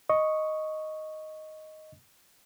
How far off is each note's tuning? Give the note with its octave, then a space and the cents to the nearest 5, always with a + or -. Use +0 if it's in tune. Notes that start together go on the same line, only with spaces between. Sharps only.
D#5 +0 C#6 +0